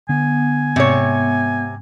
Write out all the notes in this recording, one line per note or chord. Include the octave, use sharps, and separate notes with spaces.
D3 B3 G#5
G#2 C3 C#5